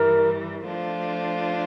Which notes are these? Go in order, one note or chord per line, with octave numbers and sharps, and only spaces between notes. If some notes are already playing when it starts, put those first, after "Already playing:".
Already playing: G2 E3 G3 A#4
F3 A3 D4 F4 C5